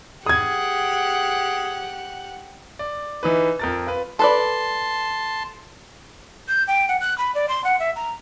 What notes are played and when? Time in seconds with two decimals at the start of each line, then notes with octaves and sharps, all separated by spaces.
0.26 G4 G#4 F#5 D#6 G#6
2.79 D5
3.23 E3 D#4 B4
3.59 F2 A#4 A6
3.87 F4 B4
4.19 A4 B4 D5 A5 C6
6.48 G6
6.68 G5
6.88 F#5
7.01 F#6
7.18 B5
7.35 D5
7.49 C6
7.64 F#5
7.80 E5
7.96 A#5